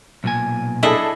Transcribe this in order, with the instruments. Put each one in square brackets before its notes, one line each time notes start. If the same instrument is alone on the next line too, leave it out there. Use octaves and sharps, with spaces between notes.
[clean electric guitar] B1 A#2 G#5
[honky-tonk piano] D4 G#4 A4 [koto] E4 D#5